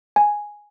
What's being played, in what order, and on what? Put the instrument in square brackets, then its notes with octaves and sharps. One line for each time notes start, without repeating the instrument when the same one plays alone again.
[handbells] G#5